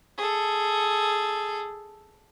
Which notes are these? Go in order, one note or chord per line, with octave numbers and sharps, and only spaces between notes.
G#4 A4